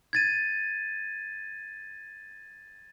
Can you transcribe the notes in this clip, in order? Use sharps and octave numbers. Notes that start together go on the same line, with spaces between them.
G#6 A6 D#7